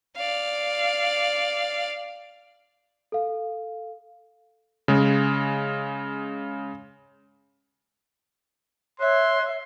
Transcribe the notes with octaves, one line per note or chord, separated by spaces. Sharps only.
D5 F5
A4 F5
C#3 G#3
C#5 E5 C6 F#6